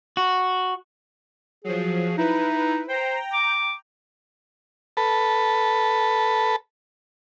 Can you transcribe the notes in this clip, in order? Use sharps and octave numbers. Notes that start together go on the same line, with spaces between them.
F#4
F3 F#3 G#4
D#4 E4 B4
C5 G5 A#5
D6
A4 B4